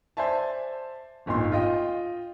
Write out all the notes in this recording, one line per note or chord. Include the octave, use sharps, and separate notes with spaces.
C5 D5 E5 G#5 A5
D1 G1 A#2 D#4 C6
F4 D#5 G5